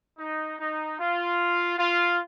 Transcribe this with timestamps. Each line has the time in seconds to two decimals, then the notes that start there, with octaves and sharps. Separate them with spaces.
0.19 D#4
0.59 D#4
0.99 F4
1.78 F4